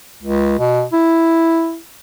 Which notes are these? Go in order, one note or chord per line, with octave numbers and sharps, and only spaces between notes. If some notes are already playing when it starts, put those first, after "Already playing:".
C#2
B2
E4